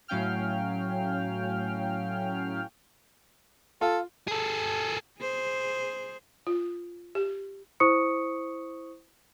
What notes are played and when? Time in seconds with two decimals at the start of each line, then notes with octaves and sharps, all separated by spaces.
0.08 A2 F#3 C#4 F5 G5 F6
3.81 F4 A4
4.28 G#4 A4
5.20 G#4 C5
6.47 F4
7.15 G4
7.80 E4 C5 C#6 D#6 C#7